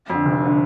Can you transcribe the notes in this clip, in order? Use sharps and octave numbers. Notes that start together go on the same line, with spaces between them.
F2 D3
F1
D3